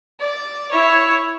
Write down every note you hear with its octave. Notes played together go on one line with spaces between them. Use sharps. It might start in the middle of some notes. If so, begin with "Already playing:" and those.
D5
E4 C#5